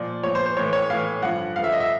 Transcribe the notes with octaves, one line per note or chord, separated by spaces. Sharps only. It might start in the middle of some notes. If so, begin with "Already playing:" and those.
Already playing: A#2 F3 D5
A#2 F3 C#5
C5
C5
A2 E3 C#5
C#5
A2 E3 F5
G2 D3 F3 F#5
G2 D3 F3 F5
E5
D#5
E5